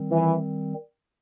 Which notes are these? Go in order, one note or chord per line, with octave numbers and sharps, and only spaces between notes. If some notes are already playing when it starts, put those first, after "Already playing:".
Already playing: D#3 G3 C4
E3